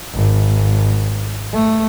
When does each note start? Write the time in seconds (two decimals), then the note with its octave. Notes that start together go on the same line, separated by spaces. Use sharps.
0.14 G#1
1.53 A3